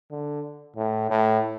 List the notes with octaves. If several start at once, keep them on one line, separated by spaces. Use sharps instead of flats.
D3
A2
A2